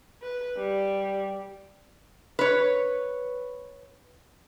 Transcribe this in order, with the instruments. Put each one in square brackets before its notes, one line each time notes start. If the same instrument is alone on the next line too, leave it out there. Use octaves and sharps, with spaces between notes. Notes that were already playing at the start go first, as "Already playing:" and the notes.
[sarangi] B4
G3
[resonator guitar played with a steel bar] B4 C#5